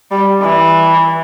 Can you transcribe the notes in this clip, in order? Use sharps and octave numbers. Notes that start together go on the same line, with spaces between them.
G3
E3